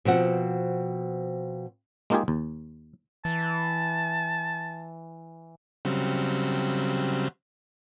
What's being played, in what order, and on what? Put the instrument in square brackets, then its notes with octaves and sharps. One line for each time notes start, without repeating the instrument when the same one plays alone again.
[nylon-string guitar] B2 F3 C4 F#5
[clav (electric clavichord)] G#3 A#3 D#4 F4 G4 G#4
D#2
[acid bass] E3 [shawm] A5
[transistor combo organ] C#3 F#3 G3 C4